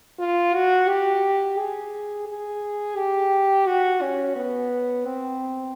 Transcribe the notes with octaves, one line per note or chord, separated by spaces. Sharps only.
F4
F#4
G4
G#4
G#4
G4
F#4
C#4
B3
C4